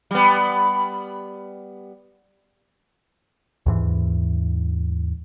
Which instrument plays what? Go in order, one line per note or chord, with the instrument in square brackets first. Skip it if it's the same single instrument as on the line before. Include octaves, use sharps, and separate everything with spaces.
[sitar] G3 B3
[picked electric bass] D#2 G#2 E3